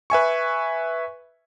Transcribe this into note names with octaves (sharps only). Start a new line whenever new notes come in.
B4 E5 G#5 C#6